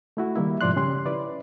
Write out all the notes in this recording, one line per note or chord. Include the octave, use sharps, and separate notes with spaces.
A3 E4 F#4
D#3 G3 A#3 E4
G#2 B2 F3 D5 C6 F#6
C#3 C#4 G4 C6
E4 B4 D5